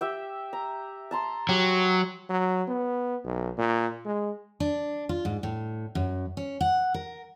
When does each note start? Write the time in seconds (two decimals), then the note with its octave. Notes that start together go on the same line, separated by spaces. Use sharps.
0.01 G4 E5 G5
0.53 A#5
1.11 A5 A#5 C6
1.49 F#3 G4
2.29 F#3
2.68 B3
3.25 B1
3.58 A#2
4.06 G#3
4.60 D4
5.09 F4
5.25 G#2
5.43 A2
5.95 F#2
6.37 C#4
6.61 F#5
6.94 A#4